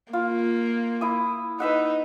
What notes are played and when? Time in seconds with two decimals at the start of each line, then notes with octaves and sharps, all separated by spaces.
0.13 A#3 F4
1.01 E4 D#6
1.60 D#4 B4 E5 F#5